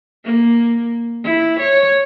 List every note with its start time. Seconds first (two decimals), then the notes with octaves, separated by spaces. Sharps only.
0.24 A#3
1.24 E4
1.59 C#5